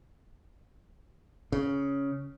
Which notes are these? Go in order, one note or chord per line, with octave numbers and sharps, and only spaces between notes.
C#3